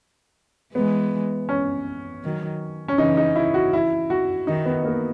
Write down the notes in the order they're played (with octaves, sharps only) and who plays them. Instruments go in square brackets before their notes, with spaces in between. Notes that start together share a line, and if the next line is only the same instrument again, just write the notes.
[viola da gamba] E3 G#3 [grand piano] B3
[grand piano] C#4
[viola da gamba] D#3 F#3
[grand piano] C#4
[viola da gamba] C#3 E3 [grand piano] D#4
[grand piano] D#4
E4
F#4
E4
F#4
[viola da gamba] D#3 [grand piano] D#4
[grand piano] B3
A#3